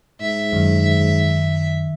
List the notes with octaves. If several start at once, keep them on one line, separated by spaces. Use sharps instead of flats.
G#2 E5
F#2 D#3